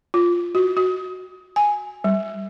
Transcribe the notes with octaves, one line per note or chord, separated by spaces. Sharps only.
F4
F#4
F#4
G#5
G3